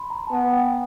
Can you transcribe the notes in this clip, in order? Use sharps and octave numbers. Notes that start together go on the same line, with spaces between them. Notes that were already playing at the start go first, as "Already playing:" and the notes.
Already playing: B5 C6
A#5
A5
B3 G#5
G5